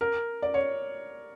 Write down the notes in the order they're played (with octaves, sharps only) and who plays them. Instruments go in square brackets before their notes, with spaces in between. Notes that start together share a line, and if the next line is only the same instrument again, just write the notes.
[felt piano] A#4
D5
C#5